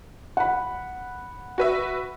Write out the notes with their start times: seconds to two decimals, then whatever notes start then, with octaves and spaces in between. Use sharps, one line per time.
0.37 F#5 B5
1.58 F#4 B4 E5